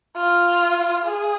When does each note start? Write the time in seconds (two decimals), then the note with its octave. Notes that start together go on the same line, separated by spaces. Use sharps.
0.16 F4
1.05 G#4